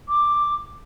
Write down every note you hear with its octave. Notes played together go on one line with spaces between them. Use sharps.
D6